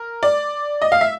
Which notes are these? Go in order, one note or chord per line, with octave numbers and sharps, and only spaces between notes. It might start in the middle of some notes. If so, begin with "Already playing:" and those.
Already playing: A#4
D5
D#5
F5
E5